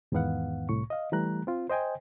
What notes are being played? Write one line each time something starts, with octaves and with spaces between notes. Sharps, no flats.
E2 G#2 D#3 B3 F5 F#5
C2 A2 C#6
D#5 F5
E3 G3 A3 A#5 F#6
C4 F4
C5 D#5 G5 G#5